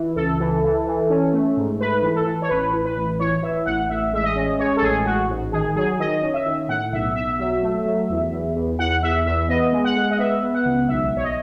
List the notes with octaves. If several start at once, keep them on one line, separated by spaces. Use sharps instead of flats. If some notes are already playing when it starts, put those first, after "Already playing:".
Already playing: E3
C#2 A4
E3
E3
E3
C#4
A3
G#2
A3 B4
E3
A4
E3
C#5
A1 B4
E3
B4
A1
E3 C#5
E3 E5
A1 F#5
A1 E5
G#3 E5
D#5
C#4
G#3 C#5
A4
A1 G#4
A1 F#4
G#2
D#3 G#4
F#3 G#4
D#3 D#5
C#4
E5
D#3
A2 F#5
B1 E5
B1 E5
F#3 E5
A3
F#3
E2
E2
E2
E2 F#5
E2 E5
E2 E5
B3 D#5
G#3
F#5
G#3
D#5
B3 E5
B3
F#5
C#2
B1 E5
B1 C#5
D#5